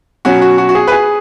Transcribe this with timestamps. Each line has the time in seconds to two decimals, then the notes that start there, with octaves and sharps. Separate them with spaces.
0.25 B2 F#3 C#4 F#4
0.42 F#4
0.58 F#4
0.69 F#4
0.75 G#4
0.87 B4
0.92 G#4